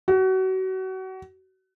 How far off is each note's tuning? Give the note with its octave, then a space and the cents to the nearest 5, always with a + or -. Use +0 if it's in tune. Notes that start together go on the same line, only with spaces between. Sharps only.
F#4 +30